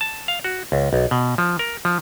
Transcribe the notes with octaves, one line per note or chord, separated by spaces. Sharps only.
A5
F5
F#4
C#2
B1
B2
F3
A#4
F3